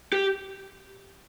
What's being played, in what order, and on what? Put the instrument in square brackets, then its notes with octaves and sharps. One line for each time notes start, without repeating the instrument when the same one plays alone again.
[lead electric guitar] G4